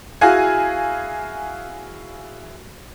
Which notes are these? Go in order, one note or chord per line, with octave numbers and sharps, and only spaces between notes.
E4 F#4 G#4 F5 G#5